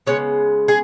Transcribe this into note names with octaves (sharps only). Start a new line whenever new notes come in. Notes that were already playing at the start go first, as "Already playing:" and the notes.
C#3 G#3 B3 C#5
G#4